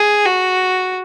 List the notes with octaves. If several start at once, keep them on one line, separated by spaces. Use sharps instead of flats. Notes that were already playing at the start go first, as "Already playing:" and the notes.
Already playing: G#4
F#4